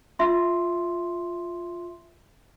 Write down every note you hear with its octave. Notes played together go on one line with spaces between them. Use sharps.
F4 E5 C6